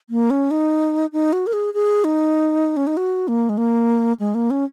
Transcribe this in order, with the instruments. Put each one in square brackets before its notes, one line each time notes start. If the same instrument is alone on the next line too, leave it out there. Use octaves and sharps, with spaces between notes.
[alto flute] A#3
C#4
D#4
D#4
F#4
A#4
G#4
G#4
D#4
C#4
D#4
F#4
A#3
G#3
A#3
G#3
A#3
C#4